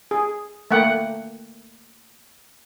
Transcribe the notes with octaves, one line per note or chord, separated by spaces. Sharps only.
G#4
A3 A#3 F#5 G5